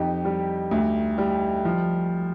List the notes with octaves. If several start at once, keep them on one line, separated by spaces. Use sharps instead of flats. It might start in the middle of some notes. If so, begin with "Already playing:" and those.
Already playing: F2 D#4 G4
G3
D2
G3
F3